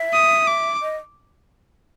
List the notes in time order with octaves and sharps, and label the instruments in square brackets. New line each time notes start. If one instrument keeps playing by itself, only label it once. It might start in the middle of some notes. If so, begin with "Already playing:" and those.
Already playing: [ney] E5
[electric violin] D#6
D6
[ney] D#5